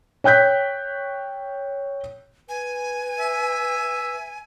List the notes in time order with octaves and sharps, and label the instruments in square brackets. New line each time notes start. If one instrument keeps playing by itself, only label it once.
[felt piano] C#5 G5 F#6 G6 B6
[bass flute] B4 [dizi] G#5
[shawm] E5